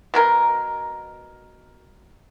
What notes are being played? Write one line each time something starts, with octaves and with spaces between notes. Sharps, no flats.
B2 F#3 A#4